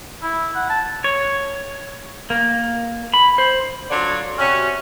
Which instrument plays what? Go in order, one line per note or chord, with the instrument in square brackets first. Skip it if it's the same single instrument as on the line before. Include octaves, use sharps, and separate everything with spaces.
[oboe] E4
F#5
A5
[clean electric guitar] C#5
A#3
B5
C5
[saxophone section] D3 F#3 D4 F4 C#5 D5
C3 C#4 F#4